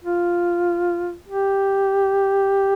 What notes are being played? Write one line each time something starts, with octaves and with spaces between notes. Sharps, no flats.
F4
G4